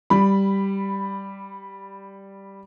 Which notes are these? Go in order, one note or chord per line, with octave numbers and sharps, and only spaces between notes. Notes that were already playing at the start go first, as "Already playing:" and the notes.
G3 B5